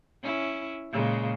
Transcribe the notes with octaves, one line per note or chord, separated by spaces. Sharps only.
C#4 E4
A#2 C#3 G#3